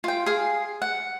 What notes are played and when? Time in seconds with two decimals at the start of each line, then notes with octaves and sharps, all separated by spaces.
0.04 F4 G5
0.26 G#4 F5
0.82 F#5